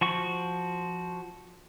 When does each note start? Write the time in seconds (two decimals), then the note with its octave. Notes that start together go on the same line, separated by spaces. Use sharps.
0.01 F3 F#4 C#6